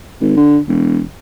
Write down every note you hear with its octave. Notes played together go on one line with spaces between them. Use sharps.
G#1
D3
E1